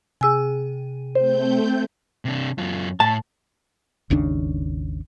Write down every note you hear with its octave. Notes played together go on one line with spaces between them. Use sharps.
C3 G#4 G#5 E6
A3 C4 C5 G6
C3 D4
F#2 F4
A2 A5
G#1 D#2 C#3 D4